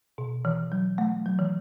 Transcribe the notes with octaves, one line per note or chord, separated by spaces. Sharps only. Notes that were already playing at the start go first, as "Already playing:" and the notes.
B2
E3
F#3
A3
F#3
E3